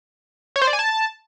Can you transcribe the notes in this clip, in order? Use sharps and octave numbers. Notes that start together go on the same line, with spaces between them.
C#5
C5
D5
G#5
A5